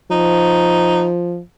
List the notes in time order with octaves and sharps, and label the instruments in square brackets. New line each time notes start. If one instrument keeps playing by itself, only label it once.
[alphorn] F3 [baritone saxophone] D#4